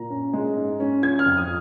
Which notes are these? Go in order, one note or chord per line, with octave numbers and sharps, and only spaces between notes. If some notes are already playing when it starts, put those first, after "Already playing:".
Already playing: A#2 A#5
C#4
G#3
G#2
C#4
F3 G#6
F6
F2
D#6